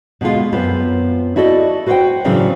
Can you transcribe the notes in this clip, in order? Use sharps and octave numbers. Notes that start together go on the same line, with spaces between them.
B2 D3 G#3 F4
F#2 B3 C4 F4 B4
E4 F#4 A4 D5 D#5
F#4 B4 C5 D5 F#5 G5
A2 C#3 E3 F#3 C4 D4